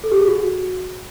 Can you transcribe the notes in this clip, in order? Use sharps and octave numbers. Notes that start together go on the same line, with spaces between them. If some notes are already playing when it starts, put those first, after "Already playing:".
A4
G4
G#4
F#4